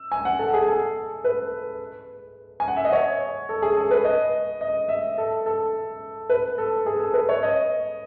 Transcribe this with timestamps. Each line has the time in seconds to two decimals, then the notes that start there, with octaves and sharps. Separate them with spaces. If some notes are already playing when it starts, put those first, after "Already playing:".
Already playing: E6
0.12 G#5
0.25 F#5
0.39 A4
0.53 G#4
0.68 A4
1.24 B4
2.60 G#5
2.68 F#5
2.76 E5
2.85 D#5
2.92 C#5
3.49 A4
3.62 G#4
3.77 A4
3.91 B4
4.04 D#5
4.61 D#5
4.89 E5
5.18 A4
5.46 A4
6.29 B4
6.58 A4
6.86 G#4
7.00 A4
7.13 B4
7.29 C#5
7.43 D#5